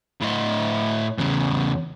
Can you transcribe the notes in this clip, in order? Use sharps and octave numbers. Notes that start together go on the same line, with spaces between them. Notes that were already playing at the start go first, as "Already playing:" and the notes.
A2 D#5
E2 C#3